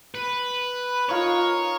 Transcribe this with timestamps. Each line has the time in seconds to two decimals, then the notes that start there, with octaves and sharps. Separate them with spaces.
0.15 B4
1.09 D#4 F4 A#4 C#5